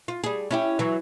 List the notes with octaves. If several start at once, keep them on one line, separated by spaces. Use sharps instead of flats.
F4
G3 G#4
C#4 E4 G4
E3 F#3